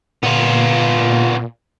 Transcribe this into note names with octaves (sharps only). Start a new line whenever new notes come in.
A#2 B3 F4